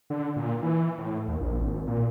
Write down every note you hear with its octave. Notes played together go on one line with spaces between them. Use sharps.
D3
A#2
E3
A2
D#2
A#1
G#1
A#2